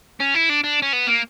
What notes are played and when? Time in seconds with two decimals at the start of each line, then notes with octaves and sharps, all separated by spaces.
0.20 C#4
0.34 E4
0.49 D4
0.64 D4
0.82 C#4
0.93 B3
1.07 A#3